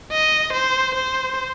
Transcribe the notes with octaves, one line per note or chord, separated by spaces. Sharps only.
D#5
C5
C5